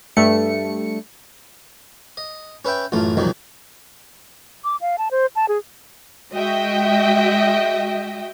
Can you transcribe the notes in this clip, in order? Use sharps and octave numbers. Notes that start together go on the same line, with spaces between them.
G2 G3 A3 C#7
D#5
C#4 B4 E5 G5
A1 F#2 E3 A3 F4
C2 F2 B2 D#3 E3 F#3
D6
F5
A5
C5
A5
G#4
G#3 F#4 D#5 E5 G5